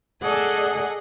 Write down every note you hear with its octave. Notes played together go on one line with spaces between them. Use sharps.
G#4 A4 D5 D#5 F#5 G#5